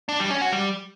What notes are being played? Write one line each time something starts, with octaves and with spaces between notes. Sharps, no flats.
D4
G3
C#4
F#4
G3